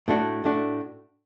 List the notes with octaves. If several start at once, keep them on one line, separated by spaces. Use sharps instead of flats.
A2 A3 D4 F#4
A2 A3 D4 F#4